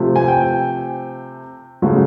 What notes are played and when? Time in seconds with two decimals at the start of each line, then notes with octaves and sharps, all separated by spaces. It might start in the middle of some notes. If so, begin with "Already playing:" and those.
Already playing: C3 F3 A3
0.16 G#5
0.28 G5
1.82 C#3 F#3 A3